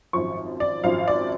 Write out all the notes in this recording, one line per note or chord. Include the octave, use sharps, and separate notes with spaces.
G#1 F#2 F3 C#6
D5
G#1 F#2 F3 F5
D5